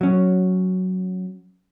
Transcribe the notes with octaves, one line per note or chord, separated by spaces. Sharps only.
F#3 C#4